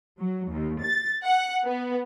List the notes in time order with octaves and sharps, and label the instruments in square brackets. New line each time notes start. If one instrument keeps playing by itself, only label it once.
[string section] F#3
D#2
A6
F#5
B3